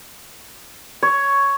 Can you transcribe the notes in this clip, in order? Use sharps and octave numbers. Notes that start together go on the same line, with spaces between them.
C#5